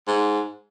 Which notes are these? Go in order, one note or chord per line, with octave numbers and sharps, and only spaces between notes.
G#2